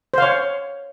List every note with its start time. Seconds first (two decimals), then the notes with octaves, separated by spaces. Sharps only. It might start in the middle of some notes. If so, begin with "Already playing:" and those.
0.14 C5
0.18 F5
0.22 C#5